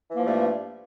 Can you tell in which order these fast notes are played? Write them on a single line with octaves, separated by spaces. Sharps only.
E3 A#3 F3 A3 G2